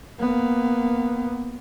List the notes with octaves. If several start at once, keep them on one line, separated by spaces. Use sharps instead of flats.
A#3 B3